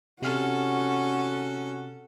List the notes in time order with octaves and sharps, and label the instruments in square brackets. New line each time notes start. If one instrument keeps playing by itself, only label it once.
[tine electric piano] C3 F6 [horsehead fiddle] C#4 F#4 [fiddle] A4